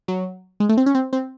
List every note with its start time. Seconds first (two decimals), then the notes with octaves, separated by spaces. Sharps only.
0.08 F#3
0.60 G#3
0.69 A3
0.77 C4
0.86 C#4
0.95 C4
1.13 C4